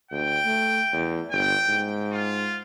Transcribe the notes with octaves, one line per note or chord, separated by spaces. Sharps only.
D2 G5
A3
E2
G1 G5
G#2
F4